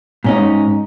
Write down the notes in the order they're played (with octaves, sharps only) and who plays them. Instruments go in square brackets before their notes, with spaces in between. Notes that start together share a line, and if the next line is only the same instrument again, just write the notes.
[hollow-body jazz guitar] G#2 C#4 D#4